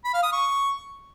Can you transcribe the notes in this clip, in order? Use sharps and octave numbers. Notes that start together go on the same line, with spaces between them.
B5
F5
D#6
C#6